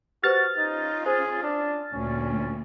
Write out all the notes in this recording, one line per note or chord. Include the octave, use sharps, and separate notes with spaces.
F#4 G4 B4 C5 F6 A6
C#4 D#4 F4
G#4 C5
D4
D2 A#2 C#4